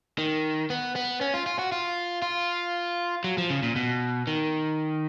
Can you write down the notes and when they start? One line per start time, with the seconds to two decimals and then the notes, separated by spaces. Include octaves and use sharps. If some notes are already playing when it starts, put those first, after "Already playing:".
0.18 D#3
0.70 B3
0.96 B3
1.21 C#4
1.34 F4
1.46 F4
1.59 F#4
1.72 F4
2.22 F4
3.24 F#3
3.38 F3
3.50 C#3
3.63 A#2
3.76 B2
4.27 D#3